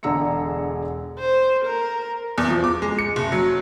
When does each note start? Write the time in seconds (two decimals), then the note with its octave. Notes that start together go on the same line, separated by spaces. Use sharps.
0.03 E1 D3 G#4 A#5 E6 C#7
1.19 C5
1.65 A#4
2.38 E2
2.50 F3
2.64 D6
2.82 G#3
2.99 C#7
3.16 F#1
3.32 F#3